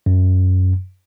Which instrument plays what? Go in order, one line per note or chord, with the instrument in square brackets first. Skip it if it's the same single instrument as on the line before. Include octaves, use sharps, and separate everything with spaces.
[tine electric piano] F#2